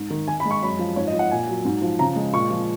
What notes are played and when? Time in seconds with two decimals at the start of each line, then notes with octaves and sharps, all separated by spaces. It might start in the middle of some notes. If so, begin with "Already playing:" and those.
Already playing: G#2
0.10 D#3
0.28 D#3 G#5
0.40 B5
0.46 G#3
0.51 C#6
0.63 F#2 B5
0.79 F3
0.96 G#2 C#5
1.08 D#5
1.13 F3
1.19 F#5
1.31 A#2 G#5
1.47 F#3
1.65 G#2
1.82 F3
1.99 C#3 A#5
2.16 G#3
2.33 A#2 C#6
2.51 F3